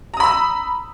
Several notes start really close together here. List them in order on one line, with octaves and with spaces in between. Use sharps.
A#5 D#6 B5 E6